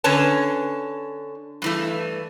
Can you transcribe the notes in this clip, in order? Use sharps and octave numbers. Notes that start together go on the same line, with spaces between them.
D3 C#4 B4 C#5 A5
G2 E3 A3